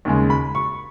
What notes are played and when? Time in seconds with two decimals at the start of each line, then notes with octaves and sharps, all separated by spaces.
0.05 D#2 C#3 G#3
0.30 B5
0.55 C#6